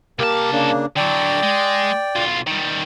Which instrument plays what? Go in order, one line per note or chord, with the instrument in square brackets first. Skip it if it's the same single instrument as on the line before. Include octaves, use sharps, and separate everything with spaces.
[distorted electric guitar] C2 A5 [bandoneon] A#3 G4 A#4
[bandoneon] C#3 A#3 D4
[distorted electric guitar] D3 F#3 [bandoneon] D5 G5
[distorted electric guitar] G#3
B1 F4
D#3 G3